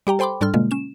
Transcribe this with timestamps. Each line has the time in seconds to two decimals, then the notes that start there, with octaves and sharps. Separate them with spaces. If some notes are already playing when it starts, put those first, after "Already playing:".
0.07 G3 G4 G5 A#5
0.19 A4 C5 G5 B5 C6 D6
0.41 G#2 G3 D4 A4 C6 F6
0.54 B2 D3 G#3 A#3 F4
0.71 C#4 E7